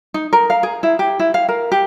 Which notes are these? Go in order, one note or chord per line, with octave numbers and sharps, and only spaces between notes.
D#4
A#4
F5
G#4
E4
G4
E4
F5
A#4
G4